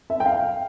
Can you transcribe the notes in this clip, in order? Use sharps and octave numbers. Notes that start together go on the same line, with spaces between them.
E5
G5
F5